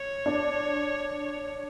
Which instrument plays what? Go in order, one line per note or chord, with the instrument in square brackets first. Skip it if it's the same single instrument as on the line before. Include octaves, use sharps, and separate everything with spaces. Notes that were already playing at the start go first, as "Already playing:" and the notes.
Already playing: [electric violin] C#5
[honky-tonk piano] D4